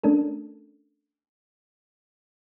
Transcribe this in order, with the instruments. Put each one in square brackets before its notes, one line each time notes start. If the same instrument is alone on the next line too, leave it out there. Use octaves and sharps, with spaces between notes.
[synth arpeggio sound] A3 C#4 D4 A4 A#4